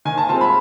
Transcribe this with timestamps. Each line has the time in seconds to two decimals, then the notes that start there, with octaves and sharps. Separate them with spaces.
0.05 D#3 G#5
0.18 A5
0.29 G#3 C4 F4 A5
0.41 B5